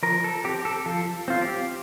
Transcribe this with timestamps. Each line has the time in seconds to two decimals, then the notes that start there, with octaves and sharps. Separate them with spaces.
0.03 F3 A#4
0.24 A4
0.44 C4 G4
0.65 A4
0.86 F3 A4
1.28 C4 F4
1.42 G4